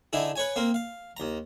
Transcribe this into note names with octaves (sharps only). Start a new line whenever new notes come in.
D3 D#4 E4 G#4
B4 C#5 G#5
A#3 C4 A#4
F5
D#2 A#5